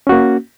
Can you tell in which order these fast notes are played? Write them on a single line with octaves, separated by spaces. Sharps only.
C#4 F#4 A#3